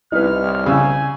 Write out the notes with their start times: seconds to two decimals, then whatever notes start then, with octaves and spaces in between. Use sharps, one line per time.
0.12 C2 D#4 E4 B4 F6
0.66 C#3 G#5 E6